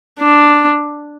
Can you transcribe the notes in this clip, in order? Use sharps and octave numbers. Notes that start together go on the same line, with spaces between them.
D4